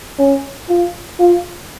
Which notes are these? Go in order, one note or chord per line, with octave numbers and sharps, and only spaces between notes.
C#4
F4
F4